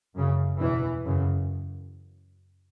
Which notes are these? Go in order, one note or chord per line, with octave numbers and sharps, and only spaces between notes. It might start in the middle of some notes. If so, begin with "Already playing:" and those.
F#2 C#3
E2 B2 E3
F#2 C#3